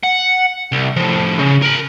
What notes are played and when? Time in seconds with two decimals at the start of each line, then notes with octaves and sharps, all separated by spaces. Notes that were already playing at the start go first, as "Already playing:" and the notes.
0.04 F#5
0.72 C2
0.96 A2 F3
1.39 C#3
1.62 A#4 B5